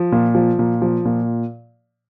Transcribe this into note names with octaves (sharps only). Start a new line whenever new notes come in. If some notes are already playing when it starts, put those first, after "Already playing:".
Already playing: F3
A#2
F3
A#2
F3
A#2